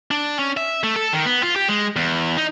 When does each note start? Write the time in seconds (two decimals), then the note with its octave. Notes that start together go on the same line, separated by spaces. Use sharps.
0.11 D4
0.39 C#4
0.57 E5
0.83 A3
0.96 A4
1.13 D#3
1.26 B3
1.43 F4
1.56 G4
1.68 G#3
1.96 E2
2.37 D#4